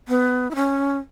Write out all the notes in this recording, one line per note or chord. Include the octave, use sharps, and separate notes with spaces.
B3
E4
C#4